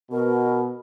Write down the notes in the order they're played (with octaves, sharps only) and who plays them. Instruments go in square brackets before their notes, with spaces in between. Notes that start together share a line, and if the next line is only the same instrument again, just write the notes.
[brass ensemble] B2 [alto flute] A#4